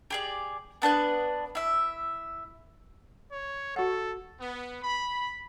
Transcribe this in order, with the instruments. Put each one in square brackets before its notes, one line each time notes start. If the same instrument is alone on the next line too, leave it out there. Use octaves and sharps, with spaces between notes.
[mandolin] G4 G#4 D5
B3 D4 B4 F#6
E4 E5
[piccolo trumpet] C#5
[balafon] F#4 F#5 [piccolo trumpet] A4
[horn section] B3
B5